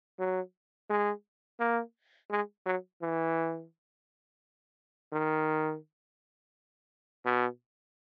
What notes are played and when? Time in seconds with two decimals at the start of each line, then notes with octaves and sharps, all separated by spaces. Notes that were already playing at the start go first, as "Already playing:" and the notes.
0.19 F#3
0.90 G#3
1.60 A#3
2.30 G#3
2.66 F#3
3.02 E3
5.13 D#3
7.25 B2